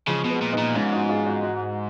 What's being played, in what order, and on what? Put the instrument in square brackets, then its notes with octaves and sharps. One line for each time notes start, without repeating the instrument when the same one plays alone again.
[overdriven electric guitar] C#3 [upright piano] F3 G#3
[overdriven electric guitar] B2
[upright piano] G#3 B3
[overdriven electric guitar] A#2
[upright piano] B3 D#4
[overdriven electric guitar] A#2
[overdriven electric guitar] G#2 [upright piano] C#4 F4
[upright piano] D#4 F#4
F4 G#4
D#4 F#4
D#4 F#4